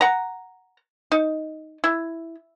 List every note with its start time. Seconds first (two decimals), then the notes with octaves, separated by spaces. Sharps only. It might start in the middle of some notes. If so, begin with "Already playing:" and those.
0.01 F#5 A#5
1.12 D#4
1.84 E4